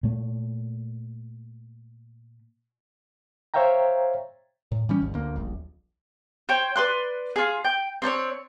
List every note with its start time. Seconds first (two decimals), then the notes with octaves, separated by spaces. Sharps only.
0.03 A#2 A3
3.54 C5 C#5 E5 F5 G5 A#5
4.72 A2
4.89 E3 G3 C#4
5.01 G#1 D#2
5.14 D2 A#3
5.36 D#1 A#1
6.49 C5 C#5 G5
6.76 B4 D5 C6 F#6
7.36 F4 G#4
7.64 G5 G6
8.02 C4 D4 C5 C#5